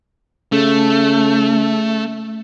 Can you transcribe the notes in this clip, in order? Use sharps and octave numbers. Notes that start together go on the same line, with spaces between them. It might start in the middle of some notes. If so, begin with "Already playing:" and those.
C#3 A3